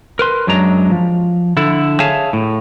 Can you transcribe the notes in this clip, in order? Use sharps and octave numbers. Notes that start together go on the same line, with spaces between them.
A#4 B4 C6
F#2 F#3 G#3 D4 A#5
F3
D3 E4 A4
G#4 C#5 E5 F5 G#5 A5
A2